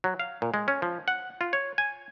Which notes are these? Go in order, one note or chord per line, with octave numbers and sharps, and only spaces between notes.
F#3
F5
A#2
G#3
C#4
F3
F#5
F4
C#5
G#5